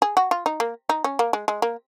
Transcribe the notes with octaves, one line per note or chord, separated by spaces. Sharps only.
G#4
F#4
F4
D#4
A#3
D#4
C#4
A#3
G#3
G#3
A#3